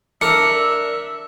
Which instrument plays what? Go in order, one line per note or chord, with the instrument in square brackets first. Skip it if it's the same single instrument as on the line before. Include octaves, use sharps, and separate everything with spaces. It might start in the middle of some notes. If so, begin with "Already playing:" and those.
[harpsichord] D4 A#4 [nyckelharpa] E5 [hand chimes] C#7